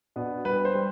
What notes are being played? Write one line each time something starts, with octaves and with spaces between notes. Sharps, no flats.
B2 B3 D4
C2 B4
C5
G3